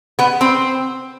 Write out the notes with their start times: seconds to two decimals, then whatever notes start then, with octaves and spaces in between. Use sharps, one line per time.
0.19 B3 B4
0.41 C4 C5